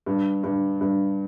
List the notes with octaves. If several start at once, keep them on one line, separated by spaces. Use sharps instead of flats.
G2
G2
G2